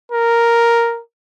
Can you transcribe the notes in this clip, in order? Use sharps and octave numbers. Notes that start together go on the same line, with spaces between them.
A#4